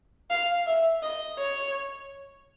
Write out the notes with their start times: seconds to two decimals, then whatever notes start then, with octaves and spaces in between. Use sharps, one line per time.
0.30 F5
0.66 E5
1.02 D#5
1.38 C#5